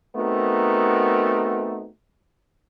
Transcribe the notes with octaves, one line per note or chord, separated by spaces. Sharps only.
A3 B3 C4 D#4 F#4 A#4